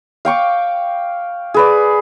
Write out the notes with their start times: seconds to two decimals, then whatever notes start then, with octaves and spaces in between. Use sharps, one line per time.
0.25 F5 G5 C#6 D6
1.54 G#4 B4 D5